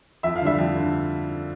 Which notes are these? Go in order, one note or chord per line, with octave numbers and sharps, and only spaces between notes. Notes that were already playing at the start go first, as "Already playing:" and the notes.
F2 E5
F5
D3 G3 E5
F2
D3